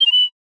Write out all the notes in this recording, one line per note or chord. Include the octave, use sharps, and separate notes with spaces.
G7
F7
F#7